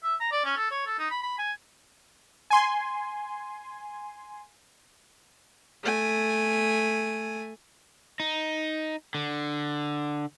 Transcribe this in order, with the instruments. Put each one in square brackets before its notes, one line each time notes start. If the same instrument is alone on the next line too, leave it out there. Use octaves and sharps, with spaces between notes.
[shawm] E5
A#5
D5
C#4
A4
C#5
A4
D#4
B5
B5
G#5
[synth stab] G#5 C6
[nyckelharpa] A3 G#5
[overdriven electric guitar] D#4
D3